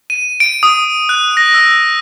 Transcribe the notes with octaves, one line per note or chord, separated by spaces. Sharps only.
D#7
D7
D#6
F#6
A#6
E6